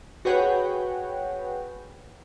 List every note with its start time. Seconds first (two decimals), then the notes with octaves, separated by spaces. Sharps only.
0.25 F#4 G#4 B4 C#5 F#5 G5